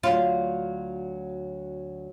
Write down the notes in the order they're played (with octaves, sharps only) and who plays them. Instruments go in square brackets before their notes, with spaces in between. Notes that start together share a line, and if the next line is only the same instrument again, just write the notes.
[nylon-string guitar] D2 F#3 [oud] F4